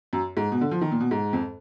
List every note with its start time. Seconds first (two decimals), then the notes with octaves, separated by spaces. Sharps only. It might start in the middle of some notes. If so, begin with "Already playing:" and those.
0.13 F#2
0.37 G#2
0.52 B2
0.61 D3
0.71 F3
0.81 D#3
0.91 A#2
1.00 B2
1.11 G#2
1.33 F2